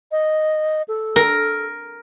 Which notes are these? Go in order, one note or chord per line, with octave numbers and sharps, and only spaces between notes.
D#5
A4
A#4